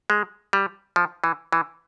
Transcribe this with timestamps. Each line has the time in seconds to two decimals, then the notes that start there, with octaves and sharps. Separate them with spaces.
0.10 G#3
0.53 G3
0.96 F3
1.24 E3
1.52 E3